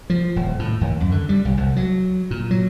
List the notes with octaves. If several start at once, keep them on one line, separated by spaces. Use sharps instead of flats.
F3
D#1
A2
D#2
F#2
D3
G3
B1
C2
F#3
A#2
F#3